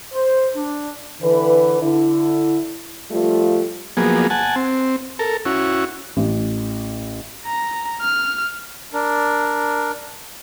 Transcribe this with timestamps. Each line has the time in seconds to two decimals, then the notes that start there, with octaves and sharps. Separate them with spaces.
0.12 C5
0.55 D4
1.22 D3 E3 B4
1.82 D3 E4
3.12 F3 G3 A3 F4
3.97 F3 F#3 A#3 B3 G#4
4.30 F#5 G#5 A5
4.56 C4
5.19 A4 A#4
5.45 C#4 E4 F#4
6.17 A1
7.46 A#5
8.02 F6
8.93 D4 A#4